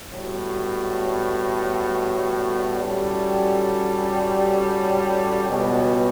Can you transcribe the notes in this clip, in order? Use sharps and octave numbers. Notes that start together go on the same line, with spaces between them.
A2 G3 B3 F#4
A2 G3 C#4 F#4 A4
C#2 B2 G3 B3 F#4